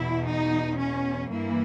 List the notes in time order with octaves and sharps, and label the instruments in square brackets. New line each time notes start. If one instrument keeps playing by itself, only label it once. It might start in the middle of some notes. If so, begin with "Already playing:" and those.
Already playing: [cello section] E2 B2 E4
D#4
C#4
G2 E3 A#3